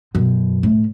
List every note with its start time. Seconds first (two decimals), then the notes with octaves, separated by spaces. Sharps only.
0.15 F#2 B2
0.63 A2